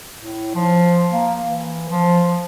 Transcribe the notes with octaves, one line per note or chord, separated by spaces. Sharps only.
A2
F3
A#3
E3
F3